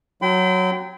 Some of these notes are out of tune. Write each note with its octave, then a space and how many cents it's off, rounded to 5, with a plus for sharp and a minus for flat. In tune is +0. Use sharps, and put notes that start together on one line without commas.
F#3 +0 G5 -20 B5 +45